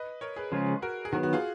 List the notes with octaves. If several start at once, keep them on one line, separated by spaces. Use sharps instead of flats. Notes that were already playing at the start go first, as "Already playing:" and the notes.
Already playing: B4 D#5
A#4 C#5
G#4 B4
C#3 F3 G#3 C#4 F4
F#4 A#4
G#4
D#3 F#3 B3 F#4
F#4
F4 G#4